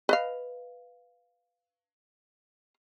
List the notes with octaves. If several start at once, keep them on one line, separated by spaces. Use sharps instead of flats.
B4 D#5 F5